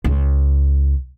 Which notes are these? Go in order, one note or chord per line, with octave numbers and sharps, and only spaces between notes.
C#2